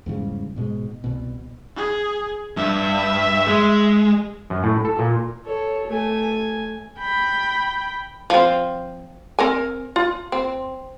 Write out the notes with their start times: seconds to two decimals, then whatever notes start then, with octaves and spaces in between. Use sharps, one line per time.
0.06 E2 G#2 C#3 G3
0.56 G#2 B2 G#3
1.04 C2 B2
1.76 G#4
2.57 G2 E5
3.47 G#3
4.50 F#2
4.63 A2
4.85 A4
4.99 A#2
5.45 A4 C#5
5.87 A3 G#5
6.99 G5 B5
8.30 F3 C4
9.39 C4 A#4 G#5
9.96 F4
10.32 C4